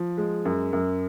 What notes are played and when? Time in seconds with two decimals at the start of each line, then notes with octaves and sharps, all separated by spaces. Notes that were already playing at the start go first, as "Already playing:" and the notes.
Already playing: F3
0.17 G#3
0.45 F#2
0.73 F#2